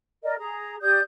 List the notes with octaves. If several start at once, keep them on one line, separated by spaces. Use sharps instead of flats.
A#4 D5 D#5
G#4 A#5
G4 D5 D#6 G6